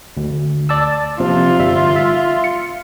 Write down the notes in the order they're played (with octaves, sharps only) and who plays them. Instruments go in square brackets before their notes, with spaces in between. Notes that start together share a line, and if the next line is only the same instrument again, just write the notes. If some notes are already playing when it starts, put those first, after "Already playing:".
[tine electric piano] D2
D5 A5 E6
[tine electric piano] C3 F3 A#3 [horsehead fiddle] F4
[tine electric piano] G1 G3 E5
E5
C#7